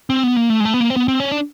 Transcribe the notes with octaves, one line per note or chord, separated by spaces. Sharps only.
C4
B3
A#3
A3
G#3
A3
B3
A#3
C4
B3
C4
C#4
D4